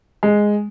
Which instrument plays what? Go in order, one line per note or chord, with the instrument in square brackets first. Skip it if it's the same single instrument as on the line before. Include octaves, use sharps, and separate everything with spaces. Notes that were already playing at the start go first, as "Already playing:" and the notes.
[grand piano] G#3